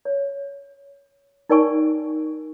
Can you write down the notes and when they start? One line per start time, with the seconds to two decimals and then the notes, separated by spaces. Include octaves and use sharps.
0.05 C#5
1.50 D#4 A#4 D5 G5 G#5 C#6